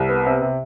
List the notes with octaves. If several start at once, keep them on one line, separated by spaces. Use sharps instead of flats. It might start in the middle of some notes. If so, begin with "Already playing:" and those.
Already playing: C2
B3
C3
C3